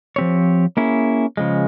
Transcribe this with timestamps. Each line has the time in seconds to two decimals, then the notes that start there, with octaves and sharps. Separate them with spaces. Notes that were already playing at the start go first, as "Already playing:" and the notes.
0.16 F3 C4 G4 C#5
0.77 A#3 C#4 E4 G#4
1.37 C#3 F3 G#3